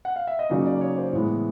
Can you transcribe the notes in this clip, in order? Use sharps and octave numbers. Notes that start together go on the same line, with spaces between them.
F#5
F5
E5
D#5
C#3 F#3 A#3 D#4 D5
D5
C#5
C5
A2 E3 G#3 B3